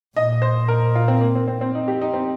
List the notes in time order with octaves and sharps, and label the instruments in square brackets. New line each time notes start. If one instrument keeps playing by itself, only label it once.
[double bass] A#2 [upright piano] D#5
[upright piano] C5
A#4
F4
C4
A#3
C4
C4
C4
D#4
G4
D#4
C4